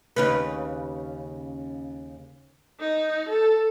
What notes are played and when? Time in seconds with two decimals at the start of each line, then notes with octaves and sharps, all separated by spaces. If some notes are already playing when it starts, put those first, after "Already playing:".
0.16 D#2 C#3 B4
2.80 D#4
3.29 A4